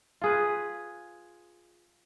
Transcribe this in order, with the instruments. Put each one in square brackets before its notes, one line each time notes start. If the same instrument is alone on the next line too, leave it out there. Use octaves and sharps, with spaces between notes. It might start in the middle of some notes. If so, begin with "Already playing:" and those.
[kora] F4 G#4 B4